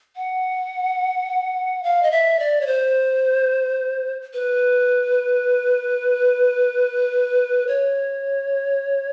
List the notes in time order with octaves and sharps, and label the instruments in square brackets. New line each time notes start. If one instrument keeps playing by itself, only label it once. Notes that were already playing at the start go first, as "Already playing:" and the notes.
[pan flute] F#5
F5
D#5
E5
D5
C#5
C5
B4
C#5